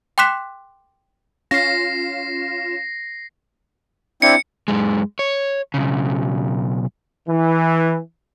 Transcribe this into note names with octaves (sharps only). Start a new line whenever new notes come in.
G5 C6 D6 F#6 B6 E7
C#4 F4 A#6 C7 E7
C4 D4 E4 C#7
F#2 G#3
C#5
B1 C#3
E3